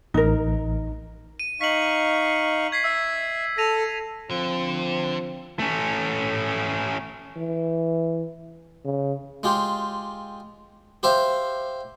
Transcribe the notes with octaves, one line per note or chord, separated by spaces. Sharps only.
A1 D#4 A#4
D#7
D#4 F5 C#6 B6 F#7
G#6 B6 C7
E5 E6
A4 A#6 D#7 F7
D3 F3 C4
A3 C#4
E3
C#3
G#3 F4 G4
G4 C5 E5 F5